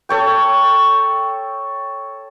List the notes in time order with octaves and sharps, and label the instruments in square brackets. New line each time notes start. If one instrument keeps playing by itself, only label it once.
[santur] A4 C#5 G5